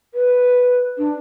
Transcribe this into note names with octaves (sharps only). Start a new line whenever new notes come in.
B4
D4